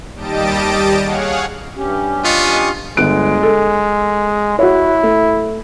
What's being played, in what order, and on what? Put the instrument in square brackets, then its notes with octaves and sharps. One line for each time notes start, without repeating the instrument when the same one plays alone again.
[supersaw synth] D#2 G3 G4 D#5 A5 D7
G#4 C#5 F5 F#5
[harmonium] G2 C#4 G4
[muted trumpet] B3 [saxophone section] F4 D#5 [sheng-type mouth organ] C#6 D#6
[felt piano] G1 F#6 D7 [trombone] G#3
[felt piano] A4
[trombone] E4 [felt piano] F#4 C#5
[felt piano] A3